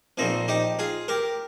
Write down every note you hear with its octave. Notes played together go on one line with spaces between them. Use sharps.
A#1 A#2 F3 C4 D#4
D#4 G4
F4 G#4
G4 A#4